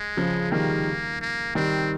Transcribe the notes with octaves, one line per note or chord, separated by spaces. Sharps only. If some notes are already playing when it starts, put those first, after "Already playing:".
Already playing: G#3
C#3 F3
D#3 G3 A#3
A#3
D#3 G3 C4